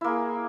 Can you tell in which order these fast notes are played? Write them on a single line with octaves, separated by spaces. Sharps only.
E4 A#3 G#4